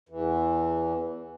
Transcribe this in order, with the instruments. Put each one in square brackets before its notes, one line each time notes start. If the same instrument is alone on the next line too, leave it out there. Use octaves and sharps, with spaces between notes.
[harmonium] E2 E3